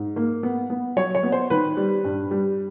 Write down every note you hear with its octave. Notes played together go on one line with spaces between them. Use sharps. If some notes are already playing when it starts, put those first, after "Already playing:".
Already playing: G#2
A#3
B3
B3
F#3 C#5
C#5
B3
C5
D#3 B4
G3
G2
G3